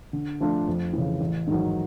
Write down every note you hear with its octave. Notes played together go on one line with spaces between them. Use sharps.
D3
F3 A3 D4 F4
F2
C#3 E3
A1
G#2 D#3 F#3